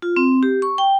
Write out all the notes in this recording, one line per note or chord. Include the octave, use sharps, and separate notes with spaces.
F4
C4
G4
C#6
G5